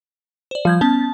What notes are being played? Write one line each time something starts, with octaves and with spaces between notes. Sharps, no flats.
C5 D5
F3 G3 G6 G#6
B3 C#4 A5